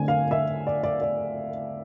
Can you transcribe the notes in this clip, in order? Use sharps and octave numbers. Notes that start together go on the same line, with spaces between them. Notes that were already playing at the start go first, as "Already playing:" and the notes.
Already playing: D3 A3 C4 G#5
F5
E5
D5
D5
D5